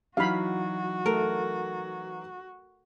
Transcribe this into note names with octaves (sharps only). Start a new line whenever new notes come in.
E3 F#3 D#4 F#4 F5 B5
A3 A4 A#4